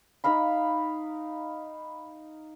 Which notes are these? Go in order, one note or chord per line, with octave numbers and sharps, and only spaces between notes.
D#4 A#4 F5 B5